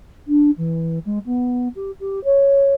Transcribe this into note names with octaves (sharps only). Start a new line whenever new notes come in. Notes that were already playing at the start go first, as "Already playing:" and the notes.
D4
E3
G#3
B3
G4
G4
C#5